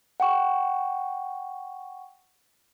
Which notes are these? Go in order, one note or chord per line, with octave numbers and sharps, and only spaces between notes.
F#5 G5 C#6